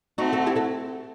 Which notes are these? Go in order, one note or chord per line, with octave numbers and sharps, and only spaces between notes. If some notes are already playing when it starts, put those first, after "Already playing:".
A3 C4 D#4 F#4
F#4 A4
E4 G4
F#4 A4